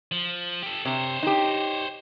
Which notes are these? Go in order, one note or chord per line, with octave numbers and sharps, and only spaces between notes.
F3
G4 A4
C3 C5 C#5
D#4 G4